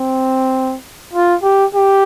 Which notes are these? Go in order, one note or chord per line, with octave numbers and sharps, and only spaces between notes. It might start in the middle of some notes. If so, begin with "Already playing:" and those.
Already playing: C4
F4
G4
G4